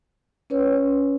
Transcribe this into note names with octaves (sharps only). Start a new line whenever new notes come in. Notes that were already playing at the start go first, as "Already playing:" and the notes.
C#4 B4 C#5